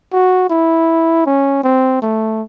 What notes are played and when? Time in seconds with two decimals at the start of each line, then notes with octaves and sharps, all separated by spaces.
0.13 F#4
0.50 E4
1.27 C#4
1.64 C4
2.02 A3